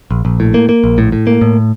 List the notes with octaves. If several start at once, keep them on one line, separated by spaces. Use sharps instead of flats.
A#1
A#1
A2
A#3
A#3
A#1
A2
A2
A#3
A2